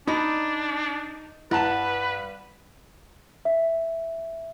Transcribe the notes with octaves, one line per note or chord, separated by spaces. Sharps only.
D4 D#4 A#5 B5
G2 E4 B4 F#5 A5 A#5 E7
E5